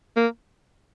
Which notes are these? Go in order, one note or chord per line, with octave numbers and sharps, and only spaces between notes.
A#3